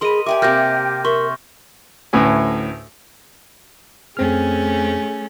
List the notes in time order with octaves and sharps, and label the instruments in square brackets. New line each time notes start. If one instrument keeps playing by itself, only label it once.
[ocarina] G#4 [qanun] A#4 D#5 [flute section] B5 [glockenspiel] C6 D#7
[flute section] G4 G5 [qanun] A#4 D5 G#5 [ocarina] E5 [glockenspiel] D6
[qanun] C3 A#3 [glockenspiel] F6 G6 A#6
[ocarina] A#4 [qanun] E5 [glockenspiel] C6 C#6
[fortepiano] D2 A2 C#4 B4 G#5
[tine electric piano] F2 C4 F6 [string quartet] A3 C#4 G#4